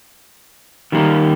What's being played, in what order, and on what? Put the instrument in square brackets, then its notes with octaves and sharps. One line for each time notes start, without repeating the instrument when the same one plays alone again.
[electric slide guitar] D#3 G3 A#3 D#4